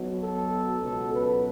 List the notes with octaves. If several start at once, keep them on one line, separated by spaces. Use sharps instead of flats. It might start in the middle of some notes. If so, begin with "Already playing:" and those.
Already playing: B1 B2 F#3
A4
C#2 B2 F#3
B4